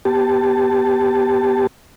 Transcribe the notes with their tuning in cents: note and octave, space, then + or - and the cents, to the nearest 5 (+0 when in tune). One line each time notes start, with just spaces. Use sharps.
B3 -10 G4 +0 A5 +0